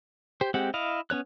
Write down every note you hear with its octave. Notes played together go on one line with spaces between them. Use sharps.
G4 C5
G#3 C4 G4 F#5
E4 D#5 F5
B3 C#4 C#5 F#6